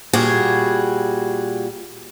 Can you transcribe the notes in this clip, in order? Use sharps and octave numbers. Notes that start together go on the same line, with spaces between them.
A#2 G3 F#4 G#4